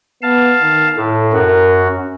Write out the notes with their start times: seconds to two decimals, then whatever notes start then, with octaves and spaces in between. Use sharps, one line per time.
0.22 B3 F5 A5
0.61 D#3
0.97 A2 A4
1.33 F#2 F#4 A#4
1.83 C#4